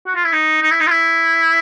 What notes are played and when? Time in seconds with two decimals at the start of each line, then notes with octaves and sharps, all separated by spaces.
0.07 F#4
0.16 F4
0.25 E4
0.33 D#4
0.62 D#4
0.71 E4
0.80 D#4
0.87 F4
0.91 E4